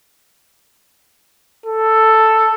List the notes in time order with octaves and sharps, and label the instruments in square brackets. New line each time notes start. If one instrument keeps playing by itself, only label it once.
[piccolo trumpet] A4